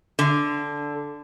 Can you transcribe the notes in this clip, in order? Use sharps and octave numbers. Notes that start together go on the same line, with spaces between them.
D3